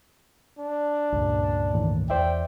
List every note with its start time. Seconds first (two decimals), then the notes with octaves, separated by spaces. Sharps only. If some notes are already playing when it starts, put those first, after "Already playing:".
0.59 D4
1.12 C#2 G2 A#2
1.74 A2 D#3 E3
2.10 E2 C5 D5 E5 G5